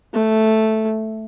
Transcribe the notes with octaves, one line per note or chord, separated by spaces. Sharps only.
A3